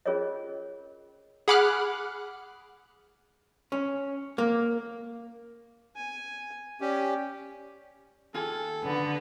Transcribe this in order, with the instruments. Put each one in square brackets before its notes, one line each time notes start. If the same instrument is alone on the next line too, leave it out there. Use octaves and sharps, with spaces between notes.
[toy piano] C#4 F4 G#4 A#4 C#5 D#5
[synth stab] G#4 F#5 B5 D6 F6 F#6
[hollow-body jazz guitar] C#4
A#3
[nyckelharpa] G#5
[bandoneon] C#4 G4 [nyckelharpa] D5
[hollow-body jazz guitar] D#2 F4 G#4 [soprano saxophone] A4
[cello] D3 [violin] B3